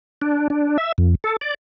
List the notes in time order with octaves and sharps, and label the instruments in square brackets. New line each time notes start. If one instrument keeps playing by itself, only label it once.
[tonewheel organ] D4
D4
E5
F2
A4
D5